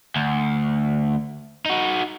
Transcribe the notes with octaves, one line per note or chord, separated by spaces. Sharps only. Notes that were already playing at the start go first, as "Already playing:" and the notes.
D2
D#4 F#4